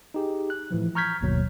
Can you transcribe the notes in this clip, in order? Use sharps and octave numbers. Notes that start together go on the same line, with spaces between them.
D#4 G4 G#4
F#6
A2 E3 F3
A#5 C#6 F6 G6 G#6 B6
G1 D#2 B2 F#3